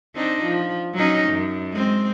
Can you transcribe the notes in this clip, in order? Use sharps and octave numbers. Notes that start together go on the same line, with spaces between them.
C4 D4 D#4
F3
F#3 C#4 D#4
F#2
G#3 C4